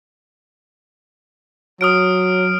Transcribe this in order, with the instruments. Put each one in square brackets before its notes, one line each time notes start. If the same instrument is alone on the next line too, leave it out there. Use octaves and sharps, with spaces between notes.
[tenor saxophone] F#3 [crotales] D#6 F6 D7